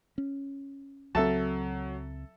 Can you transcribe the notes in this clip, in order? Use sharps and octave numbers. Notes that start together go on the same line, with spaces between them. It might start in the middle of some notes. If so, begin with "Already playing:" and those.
C#4
C#2 F#3 C4 A4 E5 A5